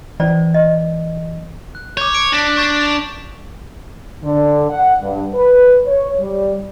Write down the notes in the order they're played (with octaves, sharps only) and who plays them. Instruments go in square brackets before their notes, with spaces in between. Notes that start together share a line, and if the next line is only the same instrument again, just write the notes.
[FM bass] E3 [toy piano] C#4 C5 D5
[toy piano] D#5
[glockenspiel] F#6
[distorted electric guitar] C#5 [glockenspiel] D6 G6
[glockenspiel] D7
[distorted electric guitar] D4 [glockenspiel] A#6 B6
[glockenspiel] C#6 G6 A6
F7
[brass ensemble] D3
F#5
G2
B4
C#5
G3